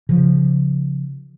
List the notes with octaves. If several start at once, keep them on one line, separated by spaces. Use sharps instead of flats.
C#3 F3